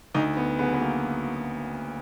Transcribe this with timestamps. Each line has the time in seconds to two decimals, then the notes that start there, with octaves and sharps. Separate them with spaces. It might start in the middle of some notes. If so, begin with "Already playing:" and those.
0.14 D2 D#4
0.37 B3
0.59 C#3 F#3 B3
0.74 B3
0.81 A#3